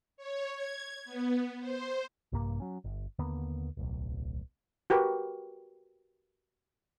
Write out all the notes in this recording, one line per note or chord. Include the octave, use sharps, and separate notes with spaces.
C#5
G#6
B3
C5
A#1 G2 C3 A#3
F#3 C#4
G1
D#2 D3 A#3 B3
D1 B1
F#4 G4 A#4 B4